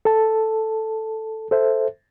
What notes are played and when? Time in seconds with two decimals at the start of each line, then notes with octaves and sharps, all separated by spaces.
0.05 A4 A5
1.51 A4 C5 E5